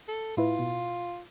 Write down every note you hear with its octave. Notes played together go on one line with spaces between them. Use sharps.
A4
A2 E4 F4 B4
B2